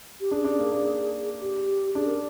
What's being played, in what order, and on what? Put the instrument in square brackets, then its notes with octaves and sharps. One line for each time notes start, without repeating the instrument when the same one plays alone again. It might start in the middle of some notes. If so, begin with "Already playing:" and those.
[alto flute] G4
[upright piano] D4 [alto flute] G#4
[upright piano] D4
A#3
D4
[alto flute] G4
[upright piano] D4 [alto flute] G#4
[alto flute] A#4